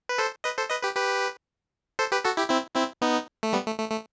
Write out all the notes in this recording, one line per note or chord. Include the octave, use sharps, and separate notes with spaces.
B4
A4 C5
B4 D#5
A4 C5
B4 D#5
G4 B4
G4 B4
A4 C5
G4 B4
F#4 A4
E4 G4
C4 E4
C4 E4
B3 D#4
A3
G3 B3
A3
A3
A3